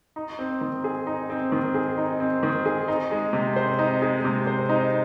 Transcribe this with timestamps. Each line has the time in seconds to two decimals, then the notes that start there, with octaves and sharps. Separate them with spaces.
0.16 D#4
0.39 C4
0.61 D#3
0.84 G#4
1.07 D#4
1.30 C4
1.52 D#3
1.74 G#4
1.97 D#4
2.20 C4
2.43 D#3
2.65 G#4
2.88 D#4
3.11 G#3
3.33 C3
3.56 C5
3.79 D#4
4.02 G#3
4.24 C3
4.47 C5
4.69 D#4